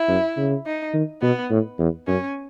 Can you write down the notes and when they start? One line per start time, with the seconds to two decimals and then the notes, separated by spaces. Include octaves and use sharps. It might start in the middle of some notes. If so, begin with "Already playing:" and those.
Already playing: E4
0.08 F#2
0.37 C#3
0.66 D#4
0.94 D#3
1.22 B2 B3
1.50 A2
1.79 E2
2.07 F#2 C#4